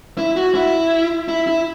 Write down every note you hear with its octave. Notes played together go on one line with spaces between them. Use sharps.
E4
F#4
E4
E4
E4